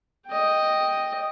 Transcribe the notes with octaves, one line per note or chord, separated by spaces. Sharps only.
D#5 G5